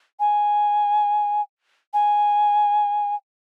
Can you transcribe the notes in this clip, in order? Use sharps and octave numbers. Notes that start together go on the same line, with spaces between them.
G#5
G#5